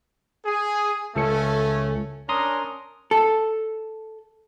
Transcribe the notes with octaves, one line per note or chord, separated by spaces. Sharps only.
G#4
C#2 A3 C#4 A4 C#7
C#4 D4 A#4 A#5 C6 D#6
A4